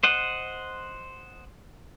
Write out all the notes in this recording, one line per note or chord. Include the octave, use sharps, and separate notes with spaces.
C5 D#5 F#5